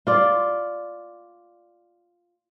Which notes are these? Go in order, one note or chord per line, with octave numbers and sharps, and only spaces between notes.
F4 D5